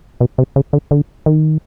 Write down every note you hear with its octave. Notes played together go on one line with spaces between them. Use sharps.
B2
C3
C#3
D3
D3
D#3